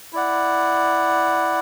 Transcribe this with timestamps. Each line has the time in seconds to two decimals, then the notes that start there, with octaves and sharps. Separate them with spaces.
0.13 E4 D5 F#5